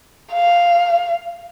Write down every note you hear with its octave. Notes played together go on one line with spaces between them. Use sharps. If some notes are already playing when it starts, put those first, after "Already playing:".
F5